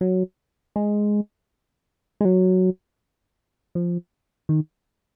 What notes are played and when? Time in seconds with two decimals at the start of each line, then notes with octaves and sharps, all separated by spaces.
0.01 F#3
0.76 G#3
2.21 G#3
2.25 F#3
3.75 F3
4.49 D#3